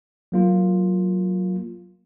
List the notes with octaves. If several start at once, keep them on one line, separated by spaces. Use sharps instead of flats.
F#3 A#3 F4